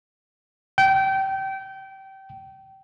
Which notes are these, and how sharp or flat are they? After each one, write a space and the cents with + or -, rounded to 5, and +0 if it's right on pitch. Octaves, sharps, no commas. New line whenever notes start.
G5 -25